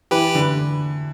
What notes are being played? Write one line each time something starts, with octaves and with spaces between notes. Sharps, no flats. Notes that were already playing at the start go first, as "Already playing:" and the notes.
E3 G4 B4
D3